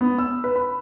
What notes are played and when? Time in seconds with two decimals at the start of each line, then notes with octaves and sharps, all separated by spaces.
0.01 B3
0.18 E6
0.44 B4
0.56 B5